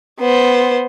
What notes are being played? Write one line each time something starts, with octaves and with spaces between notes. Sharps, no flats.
B3 C5